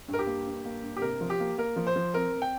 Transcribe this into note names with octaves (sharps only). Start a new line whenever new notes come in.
G2
A#4
G4
A#3
G2
A#3
G2
G4
C3 A#4
F3
G4
A#3
A#3 A#4
F3
C5
F3
C4 A#4
C4
G5